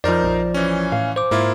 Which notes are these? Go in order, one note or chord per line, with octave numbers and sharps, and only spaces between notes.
F2 F3 D#4 A#4 C5 D5
A#1
E3 C#4
A2 F5
C5 D6
G#2 A#3 E4 F4